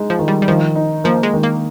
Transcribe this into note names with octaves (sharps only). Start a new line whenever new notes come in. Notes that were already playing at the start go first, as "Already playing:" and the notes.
Already playing: G#3 D#4
F3
D#3
G3
G3
D#3 F3
D#4
F3 A#3
G#3
D#3
A#3